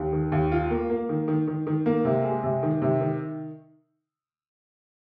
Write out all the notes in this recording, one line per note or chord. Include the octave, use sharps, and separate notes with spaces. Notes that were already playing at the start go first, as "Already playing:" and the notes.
Already playing: D#2
D#3
D#2
F4
A#3
A#3
D#3
D#3
D#3
D#3
A#3
C3
G#3
C3
D#3
C3
D#3